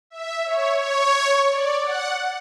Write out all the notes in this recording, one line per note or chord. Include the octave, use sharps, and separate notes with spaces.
E5
C#5
C#5
D5
F#5